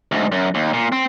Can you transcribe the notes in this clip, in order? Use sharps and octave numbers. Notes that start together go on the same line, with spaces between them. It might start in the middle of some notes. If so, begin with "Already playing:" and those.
D2 G#2
F#2
D#2
A#2
C4